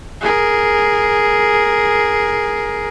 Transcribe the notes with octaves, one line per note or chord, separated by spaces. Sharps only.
G#4 A#4